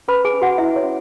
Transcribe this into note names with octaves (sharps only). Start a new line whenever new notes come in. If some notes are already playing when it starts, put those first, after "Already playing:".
C#4 B4 B5
G#4 G#5
C#4
F#4 F#5
E4 G#4 E5
C#5
C#4